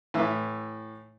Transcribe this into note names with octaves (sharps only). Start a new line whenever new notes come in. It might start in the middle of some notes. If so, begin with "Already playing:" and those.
A2 E3 E5